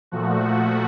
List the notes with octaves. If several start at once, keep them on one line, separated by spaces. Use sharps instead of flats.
A#2 F3 A3 F#4